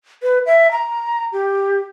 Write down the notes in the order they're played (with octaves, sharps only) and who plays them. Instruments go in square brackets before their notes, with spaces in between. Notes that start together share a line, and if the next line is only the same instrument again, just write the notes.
[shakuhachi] B4
E5
A#5
G4